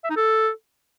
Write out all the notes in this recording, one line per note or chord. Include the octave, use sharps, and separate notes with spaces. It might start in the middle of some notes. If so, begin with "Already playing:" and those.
E5
D#4
A4